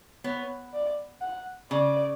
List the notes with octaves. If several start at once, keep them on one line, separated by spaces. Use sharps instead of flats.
B3 C#5
D5
F#5
C#3 D5